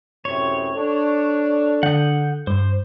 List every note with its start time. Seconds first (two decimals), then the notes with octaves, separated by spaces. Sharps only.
0.25 F#2 A2 C3 C#5
0.76 D4 A4
1.83 D3 F#5 D#6 G6
2.47 G2 C5